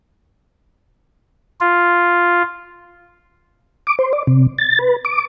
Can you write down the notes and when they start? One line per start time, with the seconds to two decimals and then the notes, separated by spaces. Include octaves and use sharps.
1.60 F4
3.87 D6
3.99 C5
4.13 D5
4.27 C3
4.58 A6
4.79 B4
5.05 D6